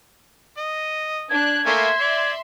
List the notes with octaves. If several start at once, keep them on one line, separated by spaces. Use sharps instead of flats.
D#5
D4 F#6 G#6
A3 A#3 E5 G#5 C6
D5